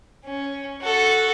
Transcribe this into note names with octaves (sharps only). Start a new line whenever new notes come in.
C#4
F#4 A4